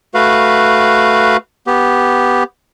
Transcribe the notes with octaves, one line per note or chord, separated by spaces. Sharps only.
A3 F#4 B4 F5
B3 G4